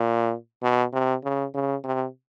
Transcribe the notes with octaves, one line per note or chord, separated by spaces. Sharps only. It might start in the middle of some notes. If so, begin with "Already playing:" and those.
Already playing: A#2
B2
C3
C#3
C#3
C3